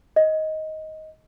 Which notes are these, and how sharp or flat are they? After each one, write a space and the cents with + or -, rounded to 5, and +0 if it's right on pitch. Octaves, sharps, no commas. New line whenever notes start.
D#5 +10